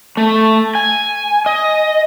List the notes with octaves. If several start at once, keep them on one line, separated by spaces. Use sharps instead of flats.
A3
G#5
D#5